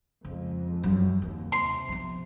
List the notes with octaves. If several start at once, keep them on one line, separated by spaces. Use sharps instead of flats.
F2 C#3 G#3
F#2 G3
D#2 C4
C3 C6
F3 B3